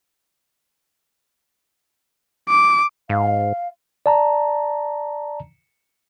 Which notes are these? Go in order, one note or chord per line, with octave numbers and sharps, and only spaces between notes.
D6
G#2 F5
D5 A5 A#5